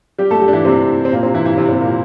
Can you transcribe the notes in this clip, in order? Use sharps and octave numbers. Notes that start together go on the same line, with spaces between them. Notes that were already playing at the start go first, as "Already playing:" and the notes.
G3 G4
A3 A4
G3 G4
D4
E3 E4
C3 C4
C4
A#2 A#3
C3 C4
E3 E4
E3 E4
A#3
C3 C4
C3 C4
A#2 A#3